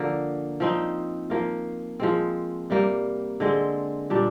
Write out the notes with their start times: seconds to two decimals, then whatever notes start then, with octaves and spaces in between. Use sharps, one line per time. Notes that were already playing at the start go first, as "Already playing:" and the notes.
Already playing: D3 F3 A#3
0.60 F3 C4 D#4
1.30 F3 A#3 F4
2.00 F3 G#3 C4
2.70 C3 G3 A#3
3.40 D3 G#3 C4
4.10 A#2 G3 D4